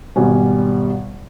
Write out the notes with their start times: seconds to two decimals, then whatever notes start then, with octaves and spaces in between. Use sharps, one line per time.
0.16 G#1 B2 G3 G#5